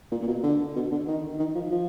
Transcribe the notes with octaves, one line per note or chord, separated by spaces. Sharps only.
A#2
A#2
B2
D3
B2
D3
D#3
D#3
F3
F3